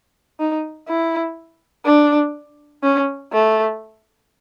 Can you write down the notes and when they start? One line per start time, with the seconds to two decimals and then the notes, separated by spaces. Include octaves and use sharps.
0.40 D#4
0.88 E4
1.86 D4
2.84 C#4
3.33 A3